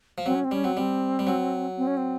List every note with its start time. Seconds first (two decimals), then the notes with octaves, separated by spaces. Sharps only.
0.18 F3
0.26 F#3 C4
0.35 C#4
0.44 C4
0.51 G3 C#4
0.64 F#3 C4
0.76 G3 C4
1.19 G3
1.27 F#3
1.78 C4
1.87 C#4
1.97 C4